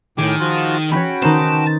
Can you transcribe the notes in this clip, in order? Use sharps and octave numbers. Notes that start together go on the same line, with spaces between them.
A2 D#3 G#4 G5 D6
F3 F4 F#4
C#4 F#4 B4 C#5 G5 B5
D#3 C#4 D#4 B4 C5 A5